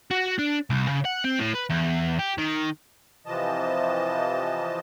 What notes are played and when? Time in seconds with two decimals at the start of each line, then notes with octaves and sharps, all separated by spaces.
0.11 F#4
0.39 D4
0.70 C2
0.88 C#3
1.05 F#5
1.25 C4
1.39 A2
1.55 B4
1.70 E2
2.19 G4
2.38 D#3
3.26 C3 E3 F3 D#5 A5